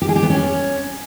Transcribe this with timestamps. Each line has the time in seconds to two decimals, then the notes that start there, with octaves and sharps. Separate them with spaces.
0.02 G4
0.09 G#4
0.16 G4
0.23 B3
0.30 C#4